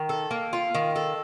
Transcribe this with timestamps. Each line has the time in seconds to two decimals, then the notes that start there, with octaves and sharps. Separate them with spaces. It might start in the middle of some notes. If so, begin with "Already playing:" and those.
Already playing: D#3
0.09 A4
0.31 A#3
0.53 F4
0.74 D#3
0.96 A4